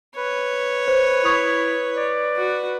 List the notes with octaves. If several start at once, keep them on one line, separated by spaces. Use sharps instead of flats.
B4 C#5
C5
E4 C#6 D#6 F7
D5
F#4